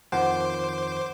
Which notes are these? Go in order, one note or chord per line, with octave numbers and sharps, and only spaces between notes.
F2 D#3 F3 C5 F#5 D6